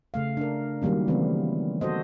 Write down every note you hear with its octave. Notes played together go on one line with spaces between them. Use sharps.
C#3 A3 F5
D4 A#4
D#3 F#3 G3 A#3 C#4
C#3 E3 A3 B3 C4
F#4 A4 C5 D#5